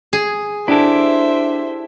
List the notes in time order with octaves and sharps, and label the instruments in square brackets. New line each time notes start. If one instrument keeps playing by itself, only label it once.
[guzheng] G#4
[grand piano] D4 [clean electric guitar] E4 G4 A4 [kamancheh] C5 E5